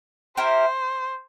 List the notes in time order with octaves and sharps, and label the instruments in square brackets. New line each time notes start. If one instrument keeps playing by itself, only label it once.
[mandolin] E4 G4 A#4 [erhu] C5